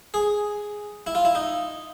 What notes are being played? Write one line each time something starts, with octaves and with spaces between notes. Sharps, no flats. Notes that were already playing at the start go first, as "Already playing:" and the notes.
G#4
E4
F4
E4
D#4